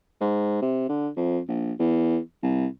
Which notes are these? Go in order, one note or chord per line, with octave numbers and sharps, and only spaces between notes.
G#2
C3
D3
F2
A#1
E2
C2